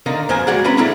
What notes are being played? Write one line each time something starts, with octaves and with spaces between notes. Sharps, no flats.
D3 D#3 A#3 D#4
F#2 A#3 B3 C5 G#5
G#3 F#4 G#4 D5 F#5
C4 C#4 B4 A#5 B5
A#3 C#4 D4 E4 G#4 A4